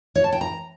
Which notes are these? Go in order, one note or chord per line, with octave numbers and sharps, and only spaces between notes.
C#5
A5
G5
A#5